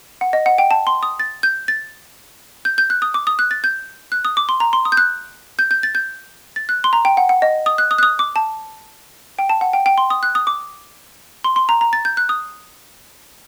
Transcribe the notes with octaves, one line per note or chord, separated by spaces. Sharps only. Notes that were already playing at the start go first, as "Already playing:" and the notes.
F#5
D#5
F#5
G5
A5
C6
D#6
A6
G6
A6
G6
G6
F#6
D#6
D6
D#6
F#6
A6
G6
F#6
D#6
D6
C6
A#5
C6
D#6
G6
F#6
G6
G6
A6
G6
A6
F#6
C6
A#5
G5
F#5
F#5
D#5
D#6
F#6
D#6
F#6
D#6
D6
A5
G5
A5
F#5
G5
G5
C6
D#6
F#6
D#6
D6
C6
C6
A#5
A#5
A6
G6
F#6
D#6